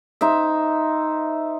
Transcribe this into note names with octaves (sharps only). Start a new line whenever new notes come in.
D#4 C5 E5